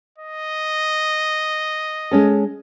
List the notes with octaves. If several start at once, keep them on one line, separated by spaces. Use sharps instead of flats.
D#5
G#3 C#4 A4